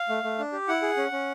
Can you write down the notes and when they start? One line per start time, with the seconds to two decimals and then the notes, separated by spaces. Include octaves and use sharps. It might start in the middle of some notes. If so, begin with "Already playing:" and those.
Already playing: F5
0.09 A3
0.24 A3
0.39 D4
0.52 G4
0.68 E4 F#5
0.82 G#4
0.97 C#4
1.12 C#4